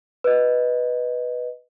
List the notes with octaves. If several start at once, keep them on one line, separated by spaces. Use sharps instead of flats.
B4 D#5